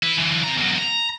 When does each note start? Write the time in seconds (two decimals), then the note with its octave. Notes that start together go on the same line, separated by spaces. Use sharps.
0.03 E4 B4
0.18 D3 E3
0.43 C3 A#5
0.57 E2 F#3
0.78 A#5